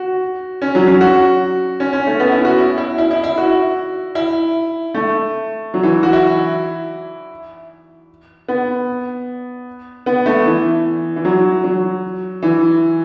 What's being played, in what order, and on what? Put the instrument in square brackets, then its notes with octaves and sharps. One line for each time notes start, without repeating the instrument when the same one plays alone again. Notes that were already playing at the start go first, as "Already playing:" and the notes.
Already playing: [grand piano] F#4
C#4
F#3
F#3
F#4
C#4
C#4
A3
B3
E4
F#4
E4
E4
E4
E4
E4
F#4
E4
A3
F#3
E3
F#4
E4
B3
B3
A3
E3
E3
F#3
F#3
E3